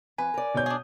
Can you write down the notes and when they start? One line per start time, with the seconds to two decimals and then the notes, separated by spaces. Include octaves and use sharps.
0.18 F2 B4 G#5
0.34 A#4 D5
0.54 B2 C#5 G6
0.66 D4 G#4 D#6